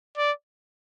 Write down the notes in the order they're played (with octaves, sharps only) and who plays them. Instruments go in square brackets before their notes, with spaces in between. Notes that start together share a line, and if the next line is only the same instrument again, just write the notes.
[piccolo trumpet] D5